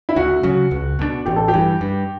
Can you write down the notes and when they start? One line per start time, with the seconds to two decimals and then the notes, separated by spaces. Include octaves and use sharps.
0.09 E4
0.16 D2 F#4
0.43 C#3 F#3
0.71 C#2
0.99 B2 G3 D4
1.26 A1 G4
1.36 A4
1.48 G4
1.53 G2 E3
1.81 G2